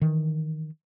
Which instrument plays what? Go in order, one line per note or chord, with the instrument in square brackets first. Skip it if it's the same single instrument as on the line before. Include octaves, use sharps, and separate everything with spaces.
[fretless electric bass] D#3 E3